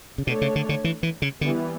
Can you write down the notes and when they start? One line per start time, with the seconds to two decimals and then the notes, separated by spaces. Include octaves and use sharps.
0.18 C#3
0.27 B2 A3 D4 A4 C#5
0.41 C#3
0.56 D3
0.69 D3
0.84 E3
1.03 E3
1.22 C#3
1.41 D3 E3 G3 B3